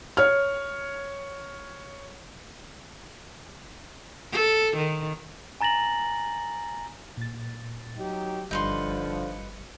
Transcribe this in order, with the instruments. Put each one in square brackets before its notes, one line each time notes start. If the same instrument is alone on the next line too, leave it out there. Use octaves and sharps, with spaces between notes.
[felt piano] C#5 F6
[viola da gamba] A4
D#3
[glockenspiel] G#5 A#5 A6 A#6 F#7
[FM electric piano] A#2 A6
[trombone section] F#3 D#4 G4
[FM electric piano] G1 G3 C#7 [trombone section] D3 F3 [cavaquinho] D#4 B4 C6